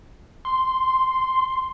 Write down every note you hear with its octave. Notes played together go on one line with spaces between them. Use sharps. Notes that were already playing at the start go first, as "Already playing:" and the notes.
C6